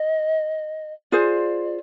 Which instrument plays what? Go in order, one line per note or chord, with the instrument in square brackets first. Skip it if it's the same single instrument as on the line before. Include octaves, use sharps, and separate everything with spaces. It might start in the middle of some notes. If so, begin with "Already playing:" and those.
Already playing: [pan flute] D#5
[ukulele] F4 G#4 C5 [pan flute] D5